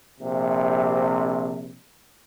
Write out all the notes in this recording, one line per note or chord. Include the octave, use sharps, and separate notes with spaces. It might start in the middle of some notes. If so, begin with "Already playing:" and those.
A#1 C3